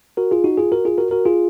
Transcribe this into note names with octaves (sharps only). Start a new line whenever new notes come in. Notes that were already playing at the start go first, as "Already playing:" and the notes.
F#4 A#4
F4 G#4
D#4 F#4
F4 G#4
F#4 A#4
F4 G#4
F#4 A#4
F#4 A#4
F4 G#4